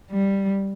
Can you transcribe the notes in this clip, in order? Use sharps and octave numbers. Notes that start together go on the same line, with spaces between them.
G3